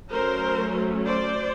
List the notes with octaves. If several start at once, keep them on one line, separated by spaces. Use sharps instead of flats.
F#3 A3 C#4 A#4 C5
C5 D5